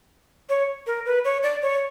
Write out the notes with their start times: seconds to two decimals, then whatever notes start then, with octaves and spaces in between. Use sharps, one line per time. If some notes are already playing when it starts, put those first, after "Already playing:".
0.49 C#5
0.87 A#4
1.06 B4
1.25 C#5
1.43 D5
1.62 C#5